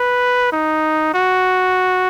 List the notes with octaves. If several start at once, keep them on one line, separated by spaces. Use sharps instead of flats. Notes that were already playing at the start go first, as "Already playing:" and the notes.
Already playing: B4
D#4
F#4